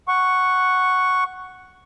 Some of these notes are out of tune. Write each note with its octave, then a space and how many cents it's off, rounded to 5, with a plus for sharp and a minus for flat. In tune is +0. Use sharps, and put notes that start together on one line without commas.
F#5 +0 C#6 +0